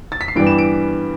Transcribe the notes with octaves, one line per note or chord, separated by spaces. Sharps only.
A6
B6
C7
G2 E3 G3 B3 D7
E7
D7